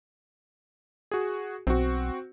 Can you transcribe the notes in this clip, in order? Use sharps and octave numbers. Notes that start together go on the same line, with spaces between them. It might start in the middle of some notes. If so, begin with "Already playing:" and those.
F#4 G#4
B1 C4 F#4